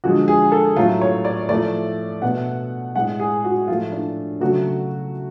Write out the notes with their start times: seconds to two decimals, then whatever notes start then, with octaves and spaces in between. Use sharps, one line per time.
0.04 D3 F3 G#3 F#4
0.28 G#4
0.52 A4
0.76 A2 F#3 A3 F4
1.01 C#5
1.25 D5
1.49 A2 F3 A3 D5
2.22 B2 A3 F#5
2.96 A2 G#3 F#5
3.20 G#4
3.45 F#4
3.68 A2 F3 A3 F4
3.92 D4
4.41 C#3 F#3 A3 F#4